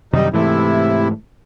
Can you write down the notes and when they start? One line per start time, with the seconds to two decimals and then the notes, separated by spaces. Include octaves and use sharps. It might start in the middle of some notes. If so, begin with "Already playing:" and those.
0.13 F#2 C3 D#3 G3 D#4
0.34 G#2 C3 E3 A3 E4